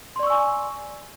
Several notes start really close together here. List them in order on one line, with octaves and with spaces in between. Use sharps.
C6 D5 C#6 E6 G#5